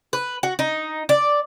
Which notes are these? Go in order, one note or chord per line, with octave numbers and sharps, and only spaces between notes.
B4
F#4
D#4
D5